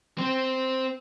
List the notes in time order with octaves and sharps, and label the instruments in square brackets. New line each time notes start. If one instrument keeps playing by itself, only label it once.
[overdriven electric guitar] C4 C5